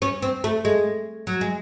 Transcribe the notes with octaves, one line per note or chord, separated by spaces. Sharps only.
C#4
C4
A3
G#3
F#3
G#3